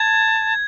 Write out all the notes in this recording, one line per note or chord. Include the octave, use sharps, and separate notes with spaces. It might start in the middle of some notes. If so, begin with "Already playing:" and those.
Already playing: A5 G#6